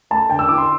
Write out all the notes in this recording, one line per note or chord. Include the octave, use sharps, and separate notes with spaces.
A3 A5
D3 G5
E6
E4 D6
C6